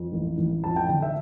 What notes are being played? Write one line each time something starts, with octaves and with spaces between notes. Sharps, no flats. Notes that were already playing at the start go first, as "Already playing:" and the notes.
Already playing: F2
A1
A1
F2 A5
G5
D3
E5